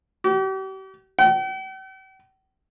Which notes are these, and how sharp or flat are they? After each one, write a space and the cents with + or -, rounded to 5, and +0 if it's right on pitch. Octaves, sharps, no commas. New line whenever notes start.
G4 -40
G5 -45